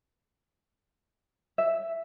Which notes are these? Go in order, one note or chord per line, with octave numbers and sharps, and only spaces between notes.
E5